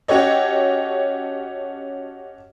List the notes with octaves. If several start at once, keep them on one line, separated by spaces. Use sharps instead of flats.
C#4 F#4 G4 A4 C#5 D#5